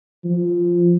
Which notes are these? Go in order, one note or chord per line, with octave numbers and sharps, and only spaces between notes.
F3